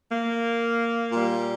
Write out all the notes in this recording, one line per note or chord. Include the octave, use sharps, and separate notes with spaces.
A#3
A#2 G3